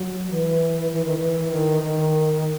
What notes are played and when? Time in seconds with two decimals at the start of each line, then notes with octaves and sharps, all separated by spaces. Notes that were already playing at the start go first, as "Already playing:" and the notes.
Already playing: F#3
0.31 E3
0.92 E3
1.05 D#3
1.18 E3
1.51 D#3
1.82 D#3